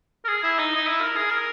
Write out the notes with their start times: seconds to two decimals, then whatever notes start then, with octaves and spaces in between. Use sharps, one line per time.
0.25 A#4
0.28 G#4
0.43 E4
0.59 D#4
0.75 D#4
0.88 E4
1.01 A#4
1.16 G#4
1.30 A#4